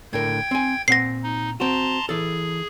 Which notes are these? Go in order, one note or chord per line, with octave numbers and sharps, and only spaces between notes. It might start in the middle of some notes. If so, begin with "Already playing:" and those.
A2 D3 A#4 G5 G#6
C4 G#5
A#2 C4 F#5 A#6 C7
D#4
C4 F#4 A5 A#5 C6
E3 G#4 A4